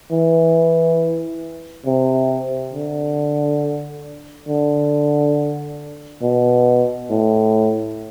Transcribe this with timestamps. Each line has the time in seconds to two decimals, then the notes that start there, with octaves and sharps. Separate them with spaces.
0.11 E3
1.86 C3
2.74 D3
4.49 D3
6.23 B2
7.10 A2